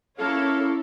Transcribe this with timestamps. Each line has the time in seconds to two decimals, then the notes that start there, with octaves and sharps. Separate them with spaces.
0.19 A#3 C#4 E4 A4 C#5 F5